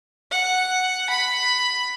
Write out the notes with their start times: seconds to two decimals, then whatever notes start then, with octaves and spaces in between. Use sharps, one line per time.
0.31 F#5
1.10 B5